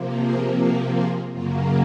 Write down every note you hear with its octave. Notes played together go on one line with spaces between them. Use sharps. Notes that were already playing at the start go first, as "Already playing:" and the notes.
Already playing: C3 F3 A#3
G#4 C5
F#4 A#4
F4 G#4
F#2 C#3 F#3 A#3 F4